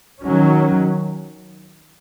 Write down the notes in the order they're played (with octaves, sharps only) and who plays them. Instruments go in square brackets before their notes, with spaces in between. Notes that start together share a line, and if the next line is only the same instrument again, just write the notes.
[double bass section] D#3 F#3 C#4